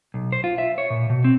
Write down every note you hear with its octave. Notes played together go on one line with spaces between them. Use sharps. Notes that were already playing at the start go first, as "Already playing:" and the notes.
B1
C5
F4
E5
C#5
A#2
B2
C4